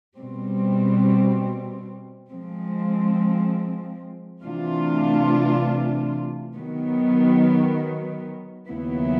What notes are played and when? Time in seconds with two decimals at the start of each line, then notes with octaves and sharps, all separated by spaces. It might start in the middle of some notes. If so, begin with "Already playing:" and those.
0.17 B2 G3 C4
2.30 F3 G#3 C4
4.43 C3 E3 A3 D4 F4
6.56 D#3 F#3 B3
8.69 D#2 C#3 F#3 B3 E4